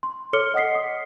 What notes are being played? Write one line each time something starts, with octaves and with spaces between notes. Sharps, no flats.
C6
A4 C#5 D6 F6 C#7 G7
D#5 F#5 D#6 B6 C7
D#6